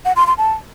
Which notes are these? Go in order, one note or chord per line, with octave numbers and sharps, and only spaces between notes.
F#5
C6
C6
A5